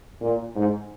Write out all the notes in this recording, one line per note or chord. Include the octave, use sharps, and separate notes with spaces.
A#2
G#2